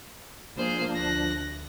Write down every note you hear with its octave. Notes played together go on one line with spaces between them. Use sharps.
F3 A#3 D4 G#4 C5
D2 F#6 A#6